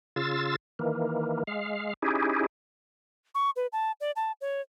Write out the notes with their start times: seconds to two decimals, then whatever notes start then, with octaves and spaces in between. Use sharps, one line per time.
0.16 C#3 F4 E6 A6
0.79 D#3 E3 A#3
1.47 G#3 F5
2.02 C#4 D#4 E4 G4 G#4
3.35 C#6
3.56 B4
3.73 A5
4.01 D5
4.16 A5
4.41 C#5